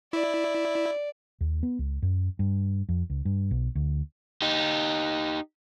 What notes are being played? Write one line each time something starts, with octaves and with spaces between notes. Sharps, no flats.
E4 D5
D#2
B3
C#2
F#2
G2
F2
C#2
G2
B1
D2
D#4 G4